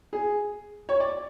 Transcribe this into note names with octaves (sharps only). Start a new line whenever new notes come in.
G#4
C#5
D5